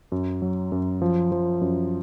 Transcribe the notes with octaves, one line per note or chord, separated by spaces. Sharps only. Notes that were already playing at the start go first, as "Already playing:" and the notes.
F#2
F#3
F#2
F3
F3
F#2